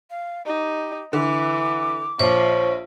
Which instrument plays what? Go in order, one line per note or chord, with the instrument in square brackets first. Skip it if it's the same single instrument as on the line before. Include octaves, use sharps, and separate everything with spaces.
[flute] F5
[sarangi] D#4 [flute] G4
[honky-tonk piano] D3 [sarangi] E3 [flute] D6
[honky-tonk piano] A#1 [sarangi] F3 [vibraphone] C5 C#5 C#6